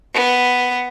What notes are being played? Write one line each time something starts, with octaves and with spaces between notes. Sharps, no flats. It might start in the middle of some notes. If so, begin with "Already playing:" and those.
B3